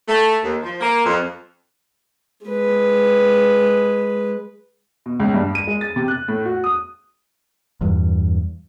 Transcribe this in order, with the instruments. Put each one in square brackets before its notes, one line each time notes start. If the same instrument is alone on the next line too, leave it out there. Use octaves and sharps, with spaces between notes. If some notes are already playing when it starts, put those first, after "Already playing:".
[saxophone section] A3
D#2
F3
A#3
F2
[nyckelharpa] G#3 B4
[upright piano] B2
C#2
G2
D#7
G#3
A6
C3
F#6
A2
F#4
D#6
[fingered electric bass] E2 G2